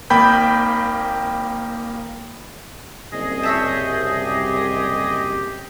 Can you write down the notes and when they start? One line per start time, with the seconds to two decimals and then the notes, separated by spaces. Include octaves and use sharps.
0.10 G#1 A#3 G5 B5 G6
3.11 F#1 C2 G#4 D#5
3.43 C#5 E5 A5 G6
4.20 G4